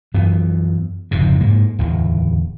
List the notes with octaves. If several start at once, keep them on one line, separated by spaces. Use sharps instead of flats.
F#2 E3 B3
F#1 F2 G#2 C3
G#2 A#3
D1 E2